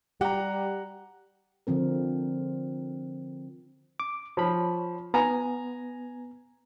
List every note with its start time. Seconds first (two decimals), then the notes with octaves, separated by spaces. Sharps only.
0.21 G3 G4 F#5 A#5
1.67 D3 F3 C4 A#4
4.00 D6
4.37 F3 C#5 B5
5.14 B3 G#5 A#5